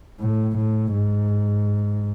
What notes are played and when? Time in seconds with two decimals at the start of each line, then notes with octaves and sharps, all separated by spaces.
0.20 A2
0.57 A2
0.93 G#2